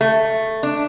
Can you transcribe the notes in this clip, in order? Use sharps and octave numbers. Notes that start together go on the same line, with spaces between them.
A3
D4